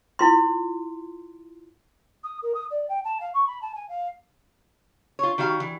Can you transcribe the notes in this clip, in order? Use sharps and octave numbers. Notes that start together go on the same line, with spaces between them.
E4 F4 C6
D#6
A#4
D#6
D5
G5
A5
F5
C#6
B5
A5
G#5
F5
F4 C#5
D#3 G3 F#4 F5
E3